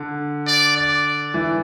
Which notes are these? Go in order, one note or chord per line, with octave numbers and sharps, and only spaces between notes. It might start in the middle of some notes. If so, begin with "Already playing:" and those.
Already playing: D3
D5
D5
E3